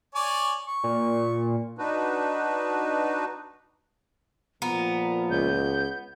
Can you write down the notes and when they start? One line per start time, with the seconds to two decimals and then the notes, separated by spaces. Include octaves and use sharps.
0.15 C#5 D5 G#5
0.67 C#6
0.84 A#2
1.78 D4 D#4 F#4 B4
4.62 A#2 F3 B3 F4 A#5
5.30 C#2 G6